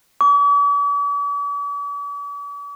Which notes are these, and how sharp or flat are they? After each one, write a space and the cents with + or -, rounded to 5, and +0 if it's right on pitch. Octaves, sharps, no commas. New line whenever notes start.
D6 -45